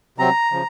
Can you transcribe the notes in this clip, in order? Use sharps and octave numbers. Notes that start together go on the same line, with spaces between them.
C3 F#3 C4 A#5
C#3 F3